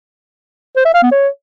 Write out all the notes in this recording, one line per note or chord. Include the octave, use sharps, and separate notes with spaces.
C5
E5
F5
B3
C#5